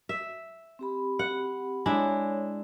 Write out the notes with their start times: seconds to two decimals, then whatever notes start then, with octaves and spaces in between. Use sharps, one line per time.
0.09 E5
0.79 C4 G4 B5
1.19 F#5
1.86 G#3 D4 E4 C#5